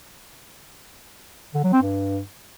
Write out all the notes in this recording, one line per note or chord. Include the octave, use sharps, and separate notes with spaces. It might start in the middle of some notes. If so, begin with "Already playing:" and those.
D3
F#3
C4
G2